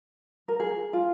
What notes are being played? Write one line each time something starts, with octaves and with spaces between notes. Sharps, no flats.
A#4
G#4
F4